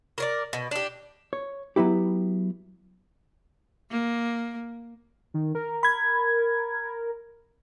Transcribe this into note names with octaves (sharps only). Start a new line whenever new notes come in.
A#4 C#5 D5
B2
D4 G4
C#5
F#3 B3 E4 G4
A#3
D#3
A#4
B5 G#6